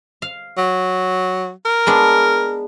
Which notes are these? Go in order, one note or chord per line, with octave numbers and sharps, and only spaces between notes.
F5
F#3
A#4
G#3 B3 D4